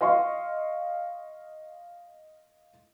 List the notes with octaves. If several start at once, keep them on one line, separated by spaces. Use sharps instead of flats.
D#5 F5 C6 C#6